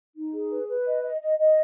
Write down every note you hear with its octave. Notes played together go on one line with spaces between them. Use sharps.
D#4
G#4
B4
B4
D#5
D#5
D#5
D#5